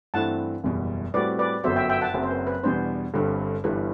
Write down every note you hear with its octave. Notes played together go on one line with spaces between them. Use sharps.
G2 E3 A3 C4 E4 F#5 A5
F#1 E2 B2 G3
A2 G3 C4 F#4 B4 D5
B4 D5
G1 F#2 F#3 B3 F#4 C5 E5
E5 G5
E5 G5
F#5 A5
F#1 F#2 F#3 C4
C5
B4
B4
E2 B2 G3 B3 D4 C5
G1 G2 D3 G3 C4
G1 G2 E3 G3 B4